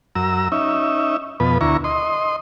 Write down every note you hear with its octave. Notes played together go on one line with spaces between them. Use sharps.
F#2 A#5 E6
C#4 D#4 E5
F2 B2 B4
D2 E4 A#5 C#6
D#5 C6